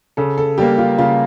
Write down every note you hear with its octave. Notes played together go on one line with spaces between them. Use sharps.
C#3 A4
A4
G3 A#3 G4
F4
C#3 F4